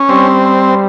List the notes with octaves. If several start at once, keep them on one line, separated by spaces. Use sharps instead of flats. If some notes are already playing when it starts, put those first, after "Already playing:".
Already playing: C#4
G3 C4